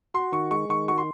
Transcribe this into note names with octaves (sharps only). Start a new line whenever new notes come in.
F#4 C6
D#3 C#6
G#3 C#6
D#3 C#6
F#4 C#6
C6